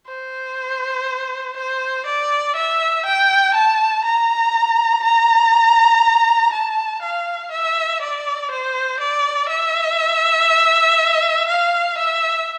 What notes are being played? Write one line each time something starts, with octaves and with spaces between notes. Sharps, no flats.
C5
C5
D5
E5
G5
A5
A#5
A#5
A5
F5
E5
D5
C5
D5
E5
F5
E5